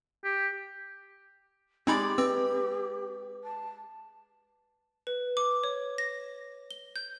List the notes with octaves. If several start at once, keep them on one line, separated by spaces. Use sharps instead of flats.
G4
G#3 C4 D#4 G4 D5 B5
C4 B4 E6
A5
B4
D6
C#5
A#6
G7
G6